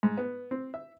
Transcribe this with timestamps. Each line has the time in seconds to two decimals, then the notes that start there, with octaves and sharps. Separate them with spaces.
0.03 G#2
0.18 B3
0.51 C4
0.74 E5